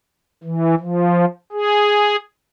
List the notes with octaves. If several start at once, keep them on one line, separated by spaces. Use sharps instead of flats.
E3
F3
G#4